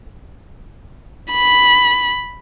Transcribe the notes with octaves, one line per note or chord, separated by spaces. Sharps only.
B5